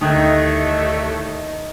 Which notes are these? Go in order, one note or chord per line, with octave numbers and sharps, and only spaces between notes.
D2 A2 D#3 G3 A3 D#4 F#6 G#6